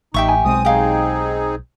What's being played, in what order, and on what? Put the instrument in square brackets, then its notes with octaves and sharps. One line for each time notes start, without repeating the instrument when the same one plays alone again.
[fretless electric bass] A1 [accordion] D#4 [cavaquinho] G4 E5 C#6
[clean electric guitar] G#5
[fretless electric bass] B1 G#3 [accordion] C4 D#6
[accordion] C4 D#4 G#4 [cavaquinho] G4 F5